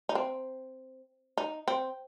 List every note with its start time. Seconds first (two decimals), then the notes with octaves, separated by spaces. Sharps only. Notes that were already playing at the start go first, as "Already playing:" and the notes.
0.09 D#4
0.15 C4
1.37 D#4
1.68 C4